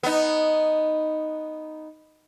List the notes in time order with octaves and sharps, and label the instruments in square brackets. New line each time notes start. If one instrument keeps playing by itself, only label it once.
[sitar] B3 D#4